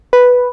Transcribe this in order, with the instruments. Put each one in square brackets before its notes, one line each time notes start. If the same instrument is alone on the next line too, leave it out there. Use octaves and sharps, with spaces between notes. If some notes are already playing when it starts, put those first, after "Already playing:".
[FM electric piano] B4